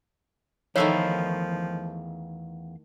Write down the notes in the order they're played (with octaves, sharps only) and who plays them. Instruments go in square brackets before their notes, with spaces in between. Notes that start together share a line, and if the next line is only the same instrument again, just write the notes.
[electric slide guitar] E2 F5 [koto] D#3 A3 E4 [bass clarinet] F3 [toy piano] C#5 E6